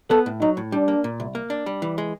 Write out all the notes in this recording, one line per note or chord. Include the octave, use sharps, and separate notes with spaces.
B3 A4
A2
F#3 D#4
A2
G3 D4
A#3
A#2
C2
A#3
D4
G3
E3
G#3